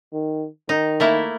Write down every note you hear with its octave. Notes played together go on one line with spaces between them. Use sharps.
D#3
D#3 D#4
A3 A#3 E4